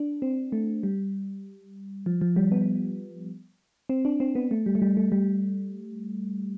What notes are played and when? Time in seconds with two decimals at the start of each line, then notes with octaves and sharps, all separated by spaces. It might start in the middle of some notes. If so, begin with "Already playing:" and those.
Already playing: D4
0.22 C4
0.52 A3
0.83 G3
2.06 F3
2.21 F3
2.36 G3
2.52 B3
3.89 C4
4.05 D4
4.20 C4
4.35 B3
4.51 A3
4.66 G3
4.75 A3
4.82 G3
4.97 A3
5.12 G3